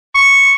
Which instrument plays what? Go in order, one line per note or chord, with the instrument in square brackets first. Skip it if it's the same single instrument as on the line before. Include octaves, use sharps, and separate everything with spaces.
[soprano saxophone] C#6